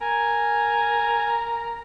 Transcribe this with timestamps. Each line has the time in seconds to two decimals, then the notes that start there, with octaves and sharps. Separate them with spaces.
0.01 A#4 G#5